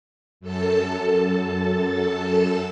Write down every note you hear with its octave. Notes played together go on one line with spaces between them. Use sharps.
F#2 A4 A5